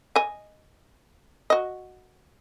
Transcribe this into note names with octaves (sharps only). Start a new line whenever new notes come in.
D#5 G#5
F#4 D#5